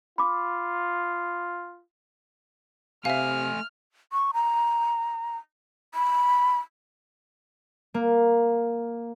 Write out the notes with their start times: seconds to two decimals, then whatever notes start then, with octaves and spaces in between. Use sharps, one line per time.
0.18 F4 B5 D6
3.05 C3 A3 E5 F5 G#5 F6
4.13 C#6
4.34 A#5
5.95 B5
7.94 A#3